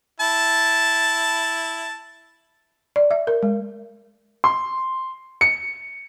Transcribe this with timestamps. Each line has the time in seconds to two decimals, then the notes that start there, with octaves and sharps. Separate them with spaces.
0.20 E4 A5
2.96 D5
3.11 E5
3.27 A#4
3.43 G#3
4.44 C6
5.41 C#7